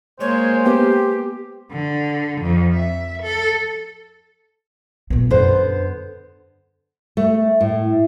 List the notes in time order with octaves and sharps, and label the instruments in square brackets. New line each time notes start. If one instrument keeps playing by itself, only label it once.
[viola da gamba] G#3 A#3 [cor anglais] C5 [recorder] C#5
[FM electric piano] B3 G5 [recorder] G4
[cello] D3
F2
E5
A4
[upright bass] A#2 B3
[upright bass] F#2 [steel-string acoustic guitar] D3 B3 C5
[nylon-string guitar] A3
A2